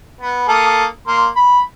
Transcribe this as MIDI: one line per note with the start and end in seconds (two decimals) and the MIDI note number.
0.21 0.44 59
0.48 0.85 58
0.48 0.85 69
0.48 0.85 87
1.08 1.27 58
1.08 1.27 84
1.37 1.61 83